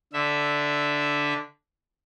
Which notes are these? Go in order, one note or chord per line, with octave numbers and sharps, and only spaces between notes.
D3 E5